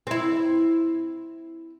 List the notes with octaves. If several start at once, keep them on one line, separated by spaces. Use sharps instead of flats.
C4 E4